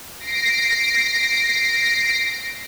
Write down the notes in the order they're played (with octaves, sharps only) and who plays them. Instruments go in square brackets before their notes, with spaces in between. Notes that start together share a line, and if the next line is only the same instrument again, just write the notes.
[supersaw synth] A#6 C7 D7